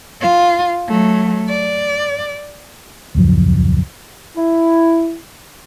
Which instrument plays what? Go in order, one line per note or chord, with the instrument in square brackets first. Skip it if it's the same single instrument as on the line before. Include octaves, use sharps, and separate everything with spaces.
[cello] F4
F#3 A3
D5
[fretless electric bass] D#1 C#2 F#2 F3
[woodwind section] E4